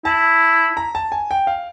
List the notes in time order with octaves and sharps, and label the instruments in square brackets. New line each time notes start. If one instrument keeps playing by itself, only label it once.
[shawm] E4 [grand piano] A5
[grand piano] A#5
A5
G#5
G5
F5